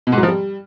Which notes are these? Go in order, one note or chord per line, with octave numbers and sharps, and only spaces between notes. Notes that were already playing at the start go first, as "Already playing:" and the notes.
B2
G#2
F#3
F3
G3